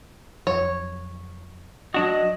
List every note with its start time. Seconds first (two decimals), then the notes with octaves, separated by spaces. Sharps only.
0.47 F2 F3 F#3 C#5
1.94 F#3 D4 F#4 D#5